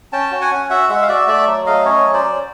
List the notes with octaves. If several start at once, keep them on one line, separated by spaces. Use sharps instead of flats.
C#4 G5 A5
F#4
F#5 G#5
C#4
F#4 E5 F#5
G#3 E5 F#5
F5
F#4 D5 E5
A3 D5 E5
F#3
A3 D#5 F5
C#4 C#5 D#5
F#3
C5 D5
F#3